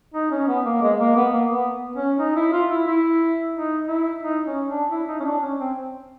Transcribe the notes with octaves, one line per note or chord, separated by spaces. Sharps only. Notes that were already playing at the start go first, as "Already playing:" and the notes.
D#4
C#4
B3
A#3
G#3
A#3
B3
A#3
B3
C#4
D#4
E4
F4
E4
E4
D#4
E4
D#4
C#4
D4
E4
D#4
C#4
D4
C#4
C4